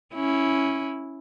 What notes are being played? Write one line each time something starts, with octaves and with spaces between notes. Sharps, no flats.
C#4 E4